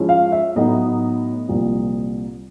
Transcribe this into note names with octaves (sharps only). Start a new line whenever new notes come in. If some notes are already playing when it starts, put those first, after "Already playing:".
Already playing: G#2 F3 G#3 C#4 E4
F5
E5
A2 F#3 B3 D#4 D#5
C2 A#2 F3